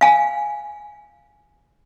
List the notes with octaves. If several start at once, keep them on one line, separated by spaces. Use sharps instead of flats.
F5 G#5